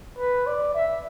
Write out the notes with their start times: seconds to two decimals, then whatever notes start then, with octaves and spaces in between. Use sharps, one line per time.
0.18 B4
0.46 D5
0.74 E5